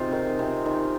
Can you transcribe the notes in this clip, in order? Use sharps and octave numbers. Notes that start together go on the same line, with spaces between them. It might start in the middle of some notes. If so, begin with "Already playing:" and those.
Already playing: C3 D#4 F4 G#4
D#3
C3
D#3